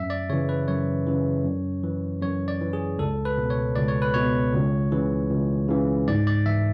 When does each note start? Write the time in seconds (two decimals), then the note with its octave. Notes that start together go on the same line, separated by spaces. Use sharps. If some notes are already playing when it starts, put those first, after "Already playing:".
Already playing: F#2 E5
0.10 D5
0.29 C#3 E3 C#5
0.49 B4
0.68 F#2 C#5
1.07 C#3 E3
1.45 F#2
1.84 E3
2.21 F#2 C#5
2.48 D5
2.61 E3
2.73 G#4
2.99 C#2 A4
3.25 B4
3.38 B2
3.50 C#5
3.76 C#2 D5
3.88 C#5
4.02 B4
4.14 B2 C#5
4.54 C#2
4.92 C#3 E3
5.31 C#2
5.68 C#3 E3
6.08 G#2 D5
6.27 D5
6.46 E3 E5